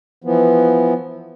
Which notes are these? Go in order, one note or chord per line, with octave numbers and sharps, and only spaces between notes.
E3 F3 B3